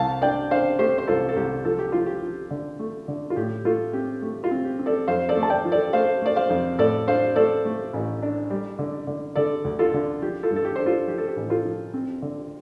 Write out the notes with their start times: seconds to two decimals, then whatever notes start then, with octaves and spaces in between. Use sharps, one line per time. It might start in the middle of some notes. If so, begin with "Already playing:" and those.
Already playing: C2 F5 A5
0.22 D4 D5 G5
0.50 D4 C5 F5
0.79 A3 G4 C5
0.98 C5
1.08 C2 F4 A4
1.29 A4
1.36 C2 G4
1.65 F3 A4
1.79 G4
1.92 F3 F4
2.06 G4
2.22 F3
2.51 D3
2.79 A3
3.08 D3
3.30 F4
3.36 A2 G4
3.65 A3 F4 A4
3.93 C4 G4
4.22 A3 G4
4.44 F4
4.51 C4
4.65 G4
4.79 C4
4.86 A4 D5
5.08 F2 C5 F5
5.29 A4 D5
5.37 A3
5.43 A5
5.50 D5 G5
5.65 F3
5.72 A4 D5
5.93 A3 C5 F5
6.22 A3 D5
6.36 C5 F5
6.50 F2
6.79 A2 A4 D5
7.08 D4 C5 F5
7.36 A3 A4 D5
7.65 A3
7.93 A1
8.22 D4
8.50 G3
8.79 D3
9.07 D3
9.36 D3 A4 D5
9.64 D2
9.79 F4 A4
9.94 D3
10.22 F3 G4
10.43 F4 A4
10.50 G2
10.56 A4
10.65 G4
10.76 D4 C5
10.86 F4 A4
11.07 F3 G4
11.18 A4
11.27 G4
11.36 A1
11.50 F4 A4
11.65 F3
11.94 C4
12.22 D3